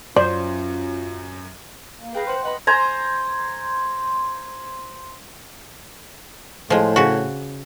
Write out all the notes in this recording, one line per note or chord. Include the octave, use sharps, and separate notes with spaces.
F#2 C#4 F4 C5 D5
A#3
G#4 B4 F5 G5 A#5
C5 F#5 C6
B4 D#5 F#5 B5
C5 G#5 A#5
A2 F3 G#3
C#3 F#4